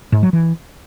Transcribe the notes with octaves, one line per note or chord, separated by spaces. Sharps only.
G#2
F#3
E3